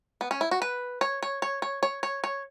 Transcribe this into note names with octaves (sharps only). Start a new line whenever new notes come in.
B3
C#4
E4
F#4
B4
C#5
C#5
C#5
C#5
C#5
C#5
C#5